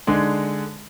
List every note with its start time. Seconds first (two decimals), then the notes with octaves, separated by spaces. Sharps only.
0.07 D3 G#3 D4 D#4 G#4